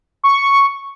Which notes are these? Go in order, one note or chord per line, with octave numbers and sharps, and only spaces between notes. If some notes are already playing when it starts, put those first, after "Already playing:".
C#6